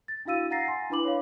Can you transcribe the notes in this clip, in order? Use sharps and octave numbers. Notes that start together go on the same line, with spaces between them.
A6
D4 E4 F#4 F5 E6 D#7
F5 F#5 A#5 A6 A#6 C7
G#5 C6
D4 E4 B4 B5 D6 F#7
C#5 F5